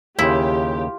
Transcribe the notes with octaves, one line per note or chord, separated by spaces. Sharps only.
D#2 C#3 E4 F4 G4